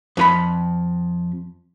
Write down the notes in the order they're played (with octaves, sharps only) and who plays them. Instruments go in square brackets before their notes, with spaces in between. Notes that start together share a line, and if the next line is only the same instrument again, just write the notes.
[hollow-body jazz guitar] F2 F4 B5